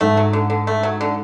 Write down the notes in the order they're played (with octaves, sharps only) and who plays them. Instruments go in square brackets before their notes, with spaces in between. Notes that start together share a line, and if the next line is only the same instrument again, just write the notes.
[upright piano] G#2 [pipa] A3
[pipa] F#3
D3
D3
A3
F#3
D3